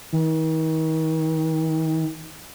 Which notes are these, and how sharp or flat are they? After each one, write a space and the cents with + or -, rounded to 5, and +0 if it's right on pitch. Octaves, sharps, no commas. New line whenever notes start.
D#3 +40